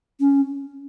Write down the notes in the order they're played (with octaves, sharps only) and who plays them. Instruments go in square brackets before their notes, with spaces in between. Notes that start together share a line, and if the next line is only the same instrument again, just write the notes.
[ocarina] C#4